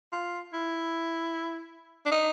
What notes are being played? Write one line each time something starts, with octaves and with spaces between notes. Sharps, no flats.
F4
E4
D4
D#4